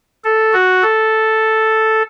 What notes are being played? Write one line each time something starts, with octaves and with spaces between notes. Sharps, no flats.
A4
F#4
A4